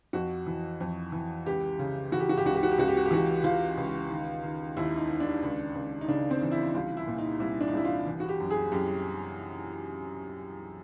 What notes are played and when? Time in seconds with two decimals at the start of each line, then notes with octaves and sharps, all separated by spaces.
0.13 F2 F#4
0.47 E3
0.80 F2
1.12 E3
1.46 C#2 G4
1.79 C#3
2.12 E3 F#4
2.20 G4
2.29 F#4
2.38 G4
2.45 C#2 F#4
2.55 G4
2.63 F#4
2.72 G4
2.78 C#2 F#4
2.88 G4
2.97 F#4
3.06 G4
3.11 E3 F#4
3.44 E3 F4
3.77 C#2
4.09 D#3
4.44 D#3
4.77 D#2 E4
4.98 D#4
5.09 D#3
5.20 D4
5.43 C#2
5.75 C#2
6.01 D#4
6.08 C#3 D4
6.31 C4
6.42 E3
6.52 E4
6.74 C2 F4
6.97 E4
7.07 A#2
7.18 D#4
7.40 C2 E4
7.61 D4
7.68 D#4
7.73 C2 E4
7.85 F4
8.07 E3
8.20 F#4
8.29 G4
8.40 F#2
8.51 G#4
8.72 F#2 G4